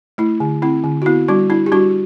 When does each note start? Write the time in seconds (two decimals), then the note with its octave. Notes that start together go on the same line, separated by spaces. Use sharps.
0.18 A3 E4
0.40 D3
0.62 C4 E4
0.84 D3
1.02 F#4
1.06 B3 E4
1.28 G3 D4 F#4
1.50 D4 E4
1.66 G4
1.72 G3 D4 F#4